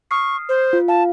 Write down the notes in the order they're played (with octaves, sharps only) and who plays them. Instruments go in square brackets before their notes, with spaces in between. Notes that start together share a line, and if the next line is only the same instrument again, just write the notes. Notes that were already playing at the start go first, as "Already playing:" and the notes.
[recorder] C#6 [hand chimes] D#6 F6 C7
[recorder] C5
[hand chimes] F4
[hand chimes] F5 [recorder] A5